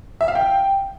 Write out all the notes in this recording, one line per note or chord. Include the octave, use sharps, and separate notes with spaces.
E5
F5
G5